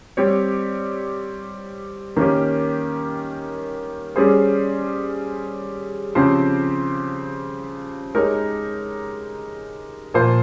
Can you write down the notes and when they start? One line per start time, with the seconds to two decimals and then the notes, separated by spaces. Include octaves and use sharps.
0.17 G3 C4 G4 C#5
2.17 D#3 A#3 C#4 G4
4.16 G3 C#4 G#4 C5
6.15 C#3 F3 C4 G4 C5
8.15 G#3 D#4 G4 A#4 C#5
10.14 A#2 F3 A#3 F4 C5